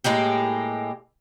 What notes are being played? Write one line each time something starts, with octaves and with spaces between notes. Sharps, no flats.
A2 G#3 A#3 G4